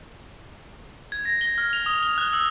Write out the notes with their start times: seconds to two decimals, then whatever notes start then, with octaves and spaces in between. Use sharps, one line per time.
1.12 G#6
1.25 A#6
1.41 G7
1.58 F6
1.73 F7
1.86 D#6
2.03 G7
2.18 F#6
2.33 E6